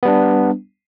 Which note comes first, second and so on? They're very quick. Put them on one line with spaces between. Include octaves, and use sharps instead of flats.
B3 G3 D4